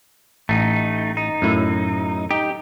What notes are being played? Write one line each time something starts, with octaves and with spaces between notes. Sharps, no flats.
A1 A3 D#4
D#4
F#2 A2 E4
D#4 G4